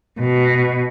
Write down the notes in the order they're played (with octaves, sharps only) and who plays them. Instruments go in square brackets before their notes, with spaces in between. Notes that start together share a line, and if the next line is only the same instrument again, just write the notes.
[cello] B2